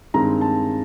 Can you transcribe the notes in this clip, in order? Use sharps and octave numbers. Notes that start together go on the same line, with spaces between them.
G2 D#3 G#3 C4 A#5
A5